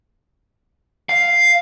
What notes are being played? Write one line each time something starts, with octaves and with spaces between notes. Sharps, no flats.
F5